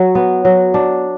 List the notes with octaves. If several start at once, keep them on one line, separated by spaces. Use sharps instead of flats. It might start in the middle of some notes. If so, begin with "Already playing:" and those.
Already playing: F#3
B3
F#3
D4